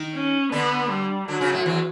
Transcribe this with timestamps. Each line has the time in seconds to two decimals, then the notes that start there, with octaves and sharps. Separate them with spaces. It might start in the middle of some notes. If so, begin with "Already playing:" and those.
Already playing: D#3 D#4
0.15 C#4
0.52 D3 B3 D4
0.90 G3
1.28 D3 F#3 D4
1.41 C#3 C#4
1.53 A2 A3
1.66 E2 E3